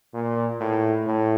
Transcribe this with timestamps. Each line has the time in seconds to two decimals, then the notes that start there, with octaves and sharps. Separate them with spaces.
0.14 A#2
0.60 A2
1.07 A2